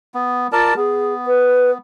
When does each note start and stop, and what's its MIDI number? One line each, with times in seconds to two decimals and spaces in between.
0.14 0.47 59
0.52 0.76 65
0.52 0.74 70
0.52 0.74 74
0.52 0.74 81
0.76 1.78 59
0.76 1.13 68
1.27 1.71 71